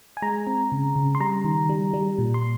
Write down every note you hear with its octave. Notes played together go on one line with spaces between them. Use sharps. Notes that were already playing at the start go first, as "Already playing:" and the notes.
G#5
G#3 A#5
C4
C#3
C#3
C6
G3 A#5
D#3
G3
G3
A#2
C6